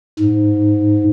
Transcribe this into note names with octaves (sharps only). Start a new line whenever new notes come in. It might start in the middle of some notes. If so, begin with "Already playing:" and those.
G#2